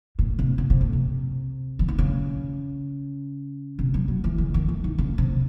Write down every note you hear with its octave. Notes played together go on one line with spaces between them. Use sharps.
A2
C3
C#3
C3
A2
C3
E3
D#3
C#3
C3
F#3
F#3
E3
C#3
D#3
E3
D#3
C#3
C3